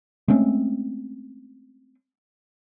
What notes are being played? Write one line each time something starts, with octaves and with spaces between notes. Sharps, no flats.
G#3 A3 C4 C#4